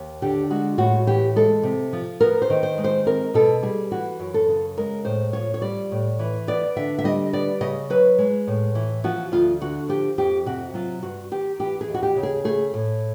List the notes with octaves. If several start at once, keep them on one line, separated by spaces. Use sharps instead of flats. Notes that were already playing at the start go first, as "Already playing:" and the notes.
Already playing: D#2
D3 G4
G#3 F#4
A2 F#4
E3 G4
G#3 A4
C3
F3
B3 A#4
C5
D#3
C5
G#3
C5
C4 A#4
B2 A4
G3 G#4
E3 F#4
F#2
A4
C#3
G#3 A#4
A2 C5
F3 C#5
C#5
G3 D5
A2
E3
B3 D5
D3 E5
E5
G3 D#5
B3 D5
C#3 D#5
F#3 B4
G#3
A2
E3
F3 F#4
D2 F4
D3 F#4
F3 G4
F2 G4
C3 F#4
F#3 F4
G2 F#4
D#3 G4
E3 G4
G#4
D#2
F#4
G4
C#3
G#4
A3 G#4
A2